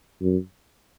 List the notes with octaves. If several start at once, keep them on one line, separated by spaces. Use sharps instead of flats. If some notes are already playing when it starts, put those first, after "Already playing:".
F#2